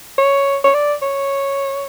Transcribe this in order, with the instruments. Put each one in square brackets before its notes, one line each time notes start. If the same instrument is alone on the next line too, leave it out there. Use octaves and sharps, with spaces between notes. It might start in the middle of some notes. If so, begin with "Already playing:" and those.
[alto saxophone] C#5
C#5
D5
C#5